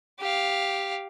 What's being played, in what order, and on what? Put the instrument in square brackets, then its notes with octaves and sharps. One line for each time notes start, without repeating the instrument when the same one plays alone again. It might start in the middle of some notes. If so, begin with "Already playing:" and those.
[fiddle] G4 F5